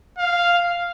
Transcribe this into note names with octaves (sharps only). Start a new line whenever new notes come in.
F5